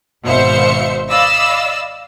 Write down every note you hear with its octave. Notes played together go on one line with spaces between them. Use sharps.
G#1 B2 C5 E5 F5 C#7
D5 D#5 F5 B5 E6